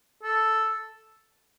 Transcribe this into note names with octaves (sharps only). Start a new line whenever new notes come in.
A4